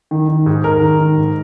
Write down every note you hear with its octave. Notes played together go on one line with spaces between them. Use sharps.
D#3
D#3
G#2
G#2 A#4
D#3
D#3
G#2